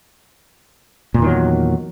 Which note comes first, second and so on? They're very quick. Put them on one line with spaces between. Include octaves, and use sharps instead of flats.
A#2 E2 D#3 F#3